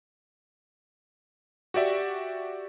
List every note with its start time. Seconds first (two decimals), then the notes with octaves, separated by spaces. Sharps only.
1.74 F#4 G4 D5 E5